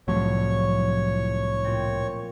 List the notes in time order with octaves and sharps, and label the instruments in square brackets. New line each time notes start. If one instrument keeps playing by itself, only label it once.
[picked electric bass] C2 A2 [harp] F3 F#3 [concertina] C#5
[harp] A#2 C4